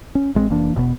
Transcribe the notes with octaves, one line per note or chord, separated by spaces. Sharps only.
C#4
A1 G#3 B3 C4
F1 E3 A#3 D4
E1 G2 B2 B3